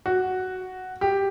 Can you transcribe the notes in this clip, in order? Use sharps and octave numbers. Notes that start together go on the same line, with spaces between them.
F#4
G4